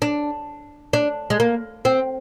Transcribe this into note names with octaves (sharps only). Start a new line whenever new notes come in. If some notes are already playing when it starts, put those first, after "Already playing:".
D4
D4
G#3
A#3
C4